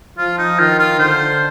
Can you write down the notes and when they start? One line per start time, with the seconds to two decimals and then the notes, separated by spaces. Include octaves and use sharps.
0.18 F3 F4
0.38 D#4
0.59 D#3 F4
0.79 F4
0.99 D3 C5